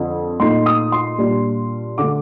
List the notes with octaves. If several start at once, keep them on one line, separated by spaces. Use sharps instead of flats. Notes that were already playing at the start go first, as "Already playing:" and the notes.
Already playing: F2 D3 F3
A#2 A3 D#4 C6
D#6
C6
A#2 G3 D4
D3 A3 D6